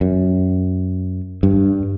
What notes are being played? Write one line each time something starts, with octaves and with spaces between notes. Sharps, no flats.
F#2
G2